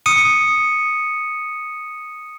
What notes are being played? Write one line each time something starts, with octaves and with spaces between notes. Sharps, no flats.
D#6 C#7 D#7